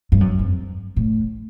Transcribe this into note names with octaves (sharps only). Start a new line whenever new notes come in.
G2
F#2
F2
A2